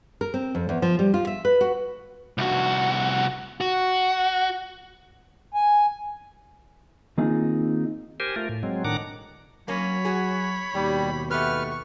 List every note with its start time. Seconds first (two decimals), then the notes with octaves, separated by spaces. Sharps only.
0.21 A#4
0.34 C4
0.55 F2
0.69 E2
0.82 F3
0.99 G3
1.14 F4
1.27 E5
1.45 B4
1.61 F#4
2.38 C2 F#4
3.61 F#4
5.54 G#5
7.18 D#3 A#3 C4 D#4 F4 G#4
8.20 G4 A#4 C5 G#5
8.36 A3 F4 A#4
8.49 A2
8.63 F#3 G#3 C4
8.84 A2 D#3 D4 F#5 A#5 D6
9.68 F#3 A#3 C#4 C#5 B5
10.05 F#4 G#4
10.75 D#2 B2 G3 G4
11.31 A3 B3 G4 B4 C#6 F6